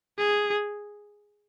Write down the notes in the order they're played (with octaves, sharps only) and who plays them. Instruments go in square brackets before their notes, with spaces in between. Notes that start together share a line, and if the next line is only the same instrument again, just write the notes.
[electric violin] G#4